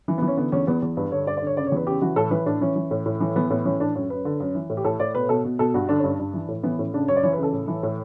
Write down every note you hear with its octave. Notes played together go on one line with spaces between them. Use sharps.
E3
B3
E3
C#4
D3 B3
E2 C#4
E2 B3
E2
G2 B4
D3 C#5
G2 D5
D5
D3 C#5
C#3 D5
C#5
E2 B4
C#3 G4
E3 F#4
A2 A4
E3 B4
A2 D4
E3 C#4
E3
A2
A2
E3
E3 B3
A2 B3
E3 C#4
A2 D4
F#2 C#5
F#2 B4
D3
F#2
E3
A2
G4
A2 A4
A2 D5
B2 B4
B2 A4
B2
B2 A4
G2 F#4
D3 D4
G2 C#4
D4
G2
E3
A2
E3 B3
A2 C#4
C#3 D4
F#2 C#5
D5
E3 C#5
B4
C#3
A4
A2
E3
A2